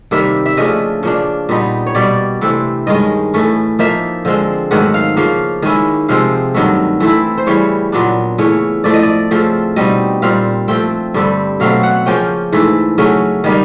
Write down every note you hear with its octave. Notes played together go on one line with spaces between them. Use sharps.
C3 D#3 G3 A#3 E5
E5
C#3 F3 A3 D4 D#5
C#3 F3 A#3 D4
A#2 G3 B3 D#4
C#5
B2 G3 A#3 D4 D5
C3 E3 A3 C4
G2 D#3 G#3 C#4 D#5
A2 E3 A3 C#4
F3 A#3 D#4 E5
D3 F3 G#3 C4
G#2 D#3 F#3 A3 F#5
F5
C#3 F3 A#3 F5
D#3 G#3 C#4 E4
C3 F3 G#3 C4 F5
G2 D#3 F#3 A3
E3 A3 C4 E4
C5
C#3 E3 G3 C#5
A#2 F#3 B3 D4
C#3 E3 A3 C#5
A2 F3 A3 D5
D#5
D5
C#3 F3 A3 C4
B2 G3 C4 D#4 D#5
A#2 G3 C4 F5
F3 A3 C4 G5
G2 D3 G3 C4
B2 F#3 A3 C4 F5
F#5
C#3 F3 A#3 C#4 G5
G#2 E3 A3
C#3 F#3 A3 C#4
D#3 G3 A#3 D#4